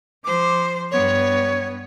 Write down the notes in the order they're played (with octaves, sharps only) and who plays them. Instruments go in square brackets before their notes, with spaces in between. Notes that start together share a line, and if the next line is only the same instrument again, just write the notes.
[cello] F3 C5 [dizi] D6
[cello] G2 B3 [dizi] C#5